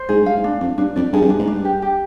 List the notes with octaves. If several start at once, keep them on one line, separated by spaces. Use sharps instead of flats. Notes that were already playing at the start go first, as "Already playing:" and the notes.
Already playing: C5
G#2 G#4
G2
F5
G#2
D4
F2 D4
G2 D4
F2 D5
G2 G#4
F2
G2
D4
G#2
G2 D4
G4
G4